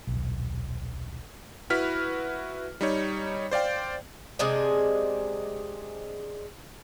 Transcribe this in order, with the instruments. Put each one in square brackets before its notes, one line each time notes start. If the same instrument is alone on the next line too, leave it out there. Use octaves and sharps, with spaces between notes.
[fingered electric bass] D#1 B1
[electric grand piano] E4 F#4 B4 F6 B6
G3 D#4 C#5
C5 D5 F5 G5
[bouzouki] C3 G#3 D4 G#4